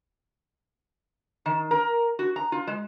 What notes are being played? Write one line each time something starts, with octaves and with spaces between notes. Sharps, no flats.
D#3
A#4
F#4
A#5
F4
G#3